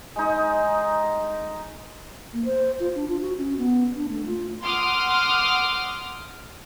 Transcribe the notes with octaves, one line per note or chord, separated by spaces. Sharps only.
G#3 D#4
A#3
C5
F4
D4
F4
F#4
C#4
B3
D4
A3
F4
F#5 C6 D6 D#6 F6